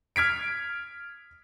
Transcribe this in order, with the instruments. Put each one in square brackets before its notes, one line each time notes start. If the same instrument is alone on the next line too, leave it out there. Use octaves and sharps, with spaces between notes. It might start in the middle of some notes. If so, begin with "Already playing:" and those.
[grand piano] F6 G#6 B6 D7